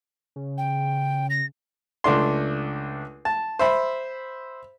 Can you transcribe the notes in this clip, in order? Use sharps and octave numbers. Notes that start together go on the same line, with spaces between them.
C#3
G5
A#6
C#2 A3 D4 C6
A5
C5 E5 B5